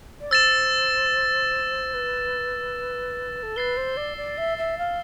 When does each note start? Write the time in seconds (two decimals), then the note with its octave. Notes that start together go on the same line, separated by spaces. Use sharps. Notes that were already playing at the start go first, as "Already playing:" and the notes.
0.21 D5
0.31 C5 E6 A6 E7
1.94 B4
3.43 A4
3.56 B4 A6 C7 G7
3.77 C5
3.97 D5
4.17 D5
4.38 E5
4.58 E5
4.78 F5